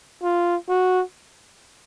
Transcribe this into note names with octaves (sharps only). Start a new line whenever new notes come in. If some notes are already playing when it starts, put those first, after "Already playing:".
F4
F#4